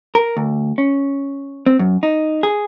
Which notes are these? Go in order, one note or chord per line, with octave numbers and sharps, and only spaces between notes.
A#4
D2
C#4
C4
F#2
D#4
G#4